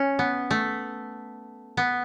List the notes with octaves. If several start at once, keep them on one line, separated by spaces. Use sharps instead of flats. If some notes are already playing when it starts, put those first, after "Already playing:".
Already playing: C#4
B3
A3
B3